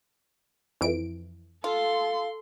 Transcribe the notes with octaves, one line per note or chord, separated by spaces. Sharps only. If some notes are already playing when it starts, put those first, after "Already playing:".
F2 E3 D7
F4 A4 C6